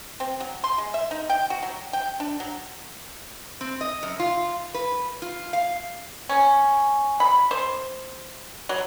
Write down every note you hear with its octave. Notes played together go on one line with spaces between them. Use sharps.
C4
F#3
C6
G#3
E5
D#4
G5
F#4
F#3
G5
D4
F#3
C4
D#5
F#2
F4
B4
F4
F5
C#4
B5
C5
F#3